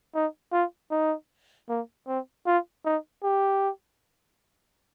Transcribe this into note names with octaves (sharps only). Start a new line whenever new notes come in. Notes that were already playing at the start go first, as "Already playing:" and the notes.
D#4
F4
D#4
A#3
C4
F4
D#4
G4